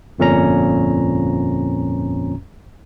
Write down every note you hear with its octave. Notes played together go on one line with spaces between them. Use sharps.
G1 F2 A#2 C#4 A#5